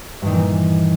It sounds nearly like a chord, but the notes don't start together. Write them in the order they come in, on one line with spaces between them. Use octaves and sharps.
G2 D#3 A#2 E3